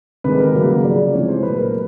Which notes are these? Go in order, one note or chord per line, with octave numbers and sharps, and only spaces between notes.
C3 D#3 G#3 B4
A#4
C#3 F#3 A#3
C#3 F3 A3 D5
C3 E3 G#3 C#5
C5
A#2 F#3 A3 B4
A#4